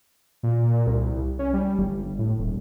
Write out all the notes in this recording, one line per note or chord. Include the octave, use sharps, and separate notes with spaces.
A#2
A#2
C2
C#4
G3
G1
A2
D#1